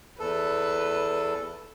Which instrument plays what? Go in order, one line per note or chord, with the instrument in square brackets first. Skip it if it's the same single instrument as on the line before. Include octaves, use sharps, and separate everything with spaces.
[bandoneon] E2 A4 [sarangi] B4